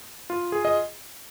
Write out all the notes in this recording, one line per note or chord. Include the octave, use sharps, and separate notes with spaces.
F4
G#4
D#5